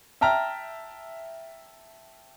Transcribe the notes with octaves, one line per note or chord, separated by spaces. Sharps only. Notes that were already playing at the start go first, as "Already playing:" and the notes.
E5 G5 A5 A#5 F6